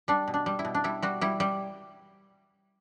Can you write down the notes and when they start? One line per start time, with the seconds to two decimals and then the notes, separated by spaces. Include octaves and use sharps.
0.08 G3 D4
0.28 B2
0.34 D4
0.46 G3
0.59 E4
0.65 B2
0.75 D4
0.84 G3 E4
1.02 G3 F#4
1.21 G3 E4
1.40 G3